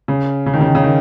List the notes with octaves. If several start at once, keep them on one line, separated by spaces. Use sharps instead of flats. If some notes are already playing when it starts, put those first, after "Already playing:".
C#3
C#3
D#3
C#3
D#3
C#3
D#3